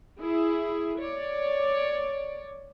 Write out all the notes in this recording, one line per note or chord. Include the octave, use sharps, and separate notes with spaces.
E4 G#4
C#5 D5